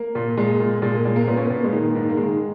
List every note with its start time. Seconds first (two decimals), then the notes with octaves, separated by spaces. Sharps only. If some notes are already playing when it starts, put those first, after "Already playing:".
Already playing: A#3
0.15 A#2
0.37 A#2 G#3
0.60 A#2
0.82 A#2 G#3
0.94 A#3
1.05 A#2 G#3
1.16 A#3
1.27 A#2 B3
1.37 C#4
1.46 A#2 B3
1.64 G#3
1.73 D#3 A#3
1.95 G#2
2.09 A#3
2.17 D#3 G#3